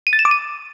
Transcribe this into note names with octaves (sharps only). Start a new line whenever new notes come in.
D#7
A6
E7
D6
D#7